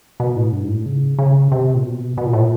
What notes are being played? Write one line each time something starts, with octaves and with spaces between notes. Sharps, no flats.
B2
A2
G2
G#2
A2
C#3
C#3
C3
A#2
B2
B2
A#2
A2
A#2